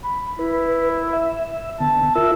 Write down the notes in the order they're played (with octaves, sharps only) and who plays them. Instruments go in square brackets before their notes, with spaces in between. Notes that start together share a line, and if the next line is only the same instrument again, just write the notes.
[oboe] B5
[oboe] E4 [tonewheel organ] B4
[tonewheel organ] E5
[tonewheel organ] D3 B3 [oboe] A5
[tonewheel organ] F4 A#4 E5 [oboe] E6